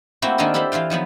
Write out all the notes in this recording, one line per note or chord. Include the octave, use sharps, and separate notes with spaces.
A3 A#3 C4 E4 F#4 G4
D#3 A#3 D4 D#4 A4 A#4
E4 G4 A4 C5 B5
E3 F4 F5 G5
D#3 F3 F#3 B3